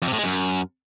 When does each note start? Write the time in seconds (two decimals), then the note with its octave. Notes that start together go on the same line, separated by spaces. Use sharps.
0.02 F2
0.08 C3
0.13 A2
0.18 G#3
0.24 F#2